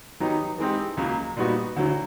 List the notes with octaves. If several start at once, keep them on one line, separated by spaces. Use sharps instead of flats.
D#3 F#3 B3 D#4 G4
E3 G#3 C4 D#4 G4
C#2 C#3 F#3 A#3
A#2 G3 B3 D#4 F#4
D2 D3 F#3